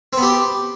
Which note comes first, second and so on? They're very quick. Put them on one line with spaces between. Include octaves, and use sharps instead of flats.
C4 B3 G4